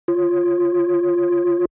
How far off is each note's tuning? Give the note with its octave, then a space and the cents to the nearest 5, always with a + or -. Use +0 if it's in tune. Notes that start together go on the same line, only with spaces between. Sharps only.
F4 +0 C#5 -20